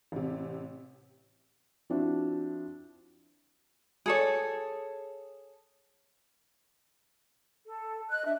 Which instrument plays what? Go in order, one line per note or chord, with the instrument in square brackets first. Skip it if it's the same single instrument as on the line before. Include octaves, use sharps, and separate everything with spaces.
[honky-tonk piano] A1 C3
[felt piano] F3 C4 D4 E4 F#4
[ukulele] G#4 A4 C#5
[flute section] A4
D#5 F#6
D4 E5